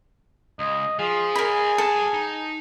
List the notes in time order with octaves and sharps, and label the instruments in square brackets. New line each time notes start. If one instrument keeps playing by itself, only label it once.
[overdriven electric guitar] C#2 [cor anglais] D#5
[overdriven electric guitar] F3 [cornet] F4 [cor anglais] G#4
[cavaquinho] A#4 B5 [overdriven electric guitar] C#5 D#5 [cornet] G#5
[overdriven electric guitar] G3 A5 [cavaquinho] A4
[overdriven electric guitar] D#4